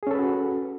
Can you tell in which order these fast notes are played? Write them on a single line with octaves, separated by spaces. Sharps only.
G#4 C#4 A4 B4 F#4